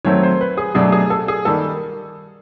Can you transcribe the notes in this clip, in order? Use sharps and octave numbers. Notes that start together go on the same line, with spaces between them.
D#3 F#3 A3 C4 C#5
C5
B4
G#4
B2 F#3 A3 D4 G#4
G#4
A4
G#4
D#3 G3 A#3 A4